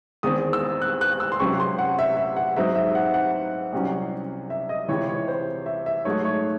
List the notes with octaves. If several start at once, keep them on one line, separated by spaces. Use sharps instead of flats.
E2 D#3 G#3 C4 D#6
E6
F#6
F#6
E6
C6
C#2 C3 F#3 C#4 C#6
C6
F#5
E5
E5
F#5
G#2 F#3 C4 D#4 E5
E5
F#5
F#5
C2 C3 F#3 C#4
E5
D#5
C#2 C3 E3 C#5
C#5
C5
E5
E5
G#2 F#3 A3 D#4 C#5
C#5